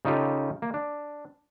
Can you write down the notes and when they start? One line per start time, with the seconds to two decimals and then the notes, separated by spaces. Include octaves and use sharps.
0.05 C#3 D#4 F4 G4 A4
0.62 A#3
0.74 D4